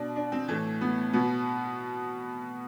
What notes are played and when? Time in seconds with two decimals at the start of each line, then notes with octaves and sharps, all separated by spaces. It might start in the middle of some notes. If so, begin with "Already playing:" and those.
Already playing: B2 D4
0.16 D4
0.32 C4
0.48 A2 E3 A3
0.81 B3
1.13 B2 B3